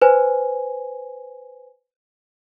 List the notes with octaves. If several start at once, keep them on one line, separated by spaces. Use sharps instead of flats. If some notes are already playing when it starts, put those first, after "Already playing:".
B4 C5 G#5